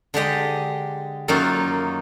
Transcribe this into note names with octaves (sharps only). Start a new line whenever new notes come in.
D3 G#3 G4 D#5
F#2 D#3 F#3 A#3 D#4 F4